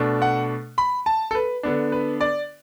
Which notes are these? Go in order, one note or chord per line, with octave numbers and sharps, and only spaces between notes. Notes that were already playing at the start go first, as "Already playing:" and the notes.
Already playing: B2 A3 D4
F#5
B5
A5
A4
B4
D3 B3 D4
B4
D5